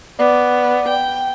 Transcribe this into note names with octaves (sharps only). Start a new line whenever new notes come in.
B3 D5
G5